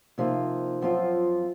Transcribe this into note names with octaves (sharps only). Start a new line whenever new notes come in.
C3 F3 A#3 D#4
F#2 F3 C4 F4